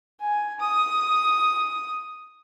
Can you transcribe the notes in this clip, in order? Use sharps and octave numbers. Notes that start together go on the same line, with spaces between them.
G#5
D#6